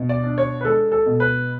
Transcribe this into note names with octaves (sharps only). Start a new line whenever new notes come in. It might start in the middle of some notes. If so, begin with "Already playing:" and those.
Already playing: B2
D5
D4
C#5
B4
G#3 A4
A4
B2
B4